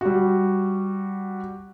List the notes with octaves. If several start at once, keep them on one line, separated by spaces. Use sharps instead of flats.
G3 F#4